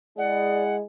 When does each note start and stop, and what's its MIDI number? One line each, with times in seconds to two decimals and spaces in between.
0.18 0.84 56
0.18 0.83 64
0.18 0.83 68
0.18 0.63 74
0.18 0.83 75
0.18 0.76 78